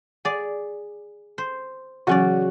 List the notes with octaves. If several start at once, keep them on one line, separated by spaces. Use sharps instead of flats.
G#4 D5 F#5
C5
C#3 E3 F#3 C#4 F#4 D5 C#6